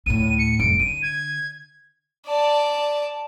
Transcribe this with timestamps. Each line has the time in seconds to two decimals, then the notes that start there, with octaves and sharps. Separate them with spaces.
0.06 D2 A2 D#7
0.39 C#7
0.59 F1 C2 D7
0.79 D3 D#7
1.03 G#6
2.26 D5 A5